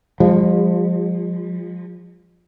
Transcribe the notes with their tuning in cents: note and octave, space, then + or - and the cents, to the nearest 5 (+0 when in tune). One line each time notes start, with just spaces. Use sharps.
F3 +20 G#3 -35